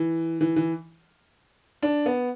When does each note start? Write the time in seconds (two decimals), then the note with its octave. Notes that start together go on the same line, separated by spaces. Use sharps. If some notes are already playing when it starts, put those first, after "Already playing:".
Already playing: E3
0.41 E3
0.56 E3
1.83 D4
2.06 B3